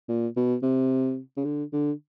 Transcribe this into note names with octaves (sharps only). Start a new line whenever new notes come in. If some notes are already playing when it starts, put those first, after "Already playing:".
A#2
B2
C3
C#3
D3
D3